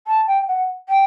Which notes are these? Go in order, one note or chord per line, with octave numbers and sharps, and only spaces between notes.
A5
G5
F#5
G5